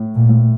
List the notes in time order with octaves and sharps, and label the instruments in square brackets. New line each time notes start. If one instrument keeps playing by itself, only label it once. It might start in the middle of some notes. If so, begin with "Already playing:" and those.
Already playing: [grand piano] A2
[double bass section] A#2
[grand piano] A2